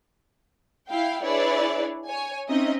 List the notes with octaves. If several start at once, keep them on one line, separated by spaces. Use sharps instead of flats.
E4 F5 G5
D4 E4 G#4 B4 C#5 D5
C#5 G#5
C4 C#4 D#4 D#5 E5